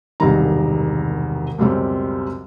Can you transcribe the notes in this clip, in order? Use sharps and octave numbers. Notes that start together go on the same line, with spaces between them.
E1 C2 G2 C3 D#3 A#5
C#2 F#2 B2 G3 C4 G4